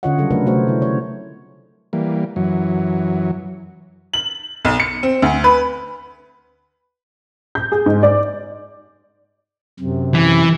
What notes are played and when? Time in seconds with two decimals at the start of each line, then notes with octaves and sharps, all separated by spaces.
0.03 D3 C#4 F4 C#5 D#5 F#5
0.18 C#3 F#3 G3 A4
0.31 C3 F#3 A3 D4 A#4 B4
0.46 C3 A3 F#4 C5 C#5
0.68 C3 E4
0.82 C#5
1.93 E3 G3 A#3
2.36 F#2 E3 F#3
4.13 F#7
4.65 B1
4.80 C#7
5.03 C4
5.22 D2
5.44 B4
7.55 G6
7.72 G#4
7.86 G#2
8.03 D5
9.80 F#2 C3
10.14 E3